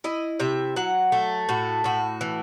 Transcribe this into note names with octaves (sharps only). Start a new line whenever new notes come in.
E4 D#5
C3 E5
F#3 F#5
A3 E5
A2 F#4
A2 F#4
E3